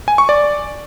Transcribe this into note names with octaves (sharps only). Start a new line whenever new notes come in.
G#5
C#6
D5